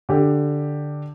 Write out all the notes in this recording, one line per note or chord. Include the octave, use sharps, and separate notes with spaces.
D3 G4